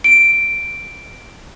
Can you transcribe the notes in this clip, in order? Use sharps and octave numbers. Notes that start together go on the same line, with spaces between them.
D7